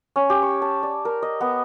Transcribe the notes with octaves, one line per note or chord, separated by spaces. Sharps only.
C#4
G4
C#6
A5
D5
A#4
D#5
B3